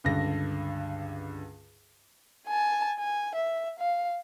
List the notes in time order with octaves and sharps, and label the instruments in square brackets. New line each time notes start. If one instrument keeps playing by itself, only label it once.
[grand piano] C#2 G2 D3 A#6
[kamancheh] G#5 A5
G#5
E5
F5